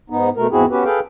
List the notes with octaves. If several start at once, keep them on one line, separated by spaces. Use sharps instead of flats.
G#2 B3 D#4
B2 A3 A#4
E2 G#2 C4 E4 F#4 G#4
B3 C#4 F#4 G4 B4
G#4 A4 B4 F5 G5